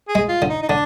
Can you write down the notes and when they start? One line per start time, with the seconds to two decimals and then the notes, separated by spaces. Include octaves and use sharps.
0.08 G#4
0.15 G#3
0.29 F4
0.42 D3
0.49 D#4
0.63 D#4
0.69 D3 D4